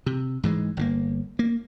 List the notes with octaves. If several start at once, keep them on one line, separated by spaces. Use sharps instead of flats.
C3
G#2 E3 F3 G#3
G1 A#2 A#3
A#3